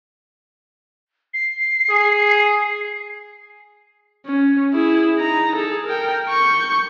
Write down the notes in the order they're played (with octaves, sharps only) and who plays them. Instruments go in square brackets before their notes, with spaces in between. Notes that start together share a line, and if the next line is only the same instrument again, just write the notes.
[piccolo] C7
[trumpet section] G#4
[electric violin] C#4
E4 G#4
D#4 A#5
G#4 A4
A#4 G5
C#6 G6